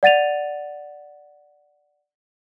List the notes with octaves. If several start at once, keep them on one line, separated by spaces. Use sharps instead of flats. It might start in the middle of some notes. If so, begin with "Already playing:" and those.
D5 F#5 A6 D#7 F7